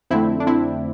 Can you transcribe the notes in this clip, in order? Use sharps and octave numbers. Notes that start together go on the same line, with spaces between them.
F2 D3 A3 C4 E4
D4
C4 E4